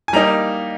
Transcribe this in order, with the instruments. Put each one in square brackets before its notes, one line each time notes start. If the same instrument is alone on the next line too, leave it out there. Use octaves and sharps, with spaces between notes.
[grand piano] G#5
G3 A#3 D#4 A#5